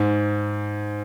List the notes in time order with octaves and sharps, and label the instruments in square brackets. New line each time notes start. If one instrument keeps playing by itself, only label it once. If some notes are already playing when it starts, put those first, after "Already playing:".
Already playing: [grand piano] G#2